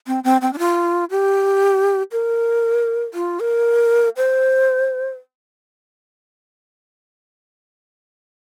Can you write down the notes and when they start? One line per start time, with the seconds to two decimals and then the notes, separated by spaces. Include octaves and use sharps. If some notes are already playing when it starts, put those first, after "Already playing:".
0.07 C4
0.24 C4
0.41 C4
0.53 D4
0.59 F4
1.10 G4
2.12 A#4
3.14 F4
3.40 A#4
4.17 C5